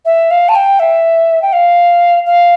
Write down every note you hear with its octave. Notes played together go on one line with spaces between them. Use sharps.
E5
F5
A5
G5
E5
G5
F5
F5